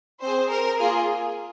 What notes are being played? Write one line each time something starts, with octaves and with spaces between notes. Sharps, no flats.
C4 G#4 C5
A#4
A#3 F4 G#4